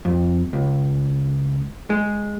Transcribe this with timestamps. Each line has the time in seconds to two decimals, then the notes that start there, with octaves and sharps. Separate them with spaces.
0.05 F2
0.53 C#2
1.90 G#3